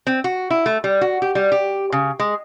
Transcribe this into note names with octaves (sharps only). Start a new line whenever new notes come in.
C4
F#4
E4
A3
G3
F#4
G4
G3
G4
C#3
G#3